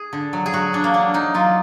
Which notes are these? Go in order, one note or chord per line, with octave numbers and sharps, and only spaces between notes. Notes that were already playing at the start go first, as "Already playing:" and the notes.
Already playing: G#4
D3
F#3
G#4
F#3 F#4
D3 D4
A#3
F#3 D4
F#3 D#4
F#3 F4